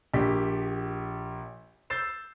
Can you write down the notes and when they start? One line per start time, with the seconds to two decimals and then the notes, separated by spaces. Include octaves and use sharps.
0.14 A#1 G4 B6
1.90 E6 G6 A6 C7 E7